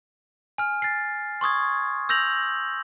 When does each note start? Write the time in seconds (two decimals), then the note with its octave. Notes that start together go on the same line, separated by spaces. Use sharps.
0.58 G#5 F6
0.82 A6 C7
1.41 C6 C#6 D#6 G#6
2.09 E6 G6 A#6 F7 F#7